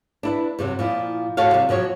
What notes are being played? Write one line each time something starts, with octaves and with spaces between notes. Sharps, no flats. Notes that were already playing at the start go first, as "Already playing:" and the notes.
D4 E4 B4
G2 C3 F#3
A#2 F3 E4
A2 F#4 A4 C#5 F5
C3 G3
B2 F3 F#3 C#5